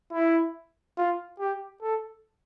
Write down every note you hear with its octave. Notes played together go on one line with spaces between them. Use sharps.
E4
F4
G4
A4